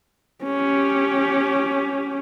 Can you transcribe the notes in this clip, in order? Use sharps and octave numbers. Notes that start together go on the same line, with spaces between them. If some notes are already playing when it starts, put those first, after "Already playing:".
C#4 G4